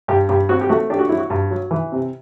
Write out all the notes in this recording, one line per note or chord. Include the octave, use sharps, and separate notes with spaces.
G2 G4
G2 G4
C4 F#4
G4
A3 F#4
D4 G4
F#4
F#3 E4
F#4
G2
F#3
E3
C3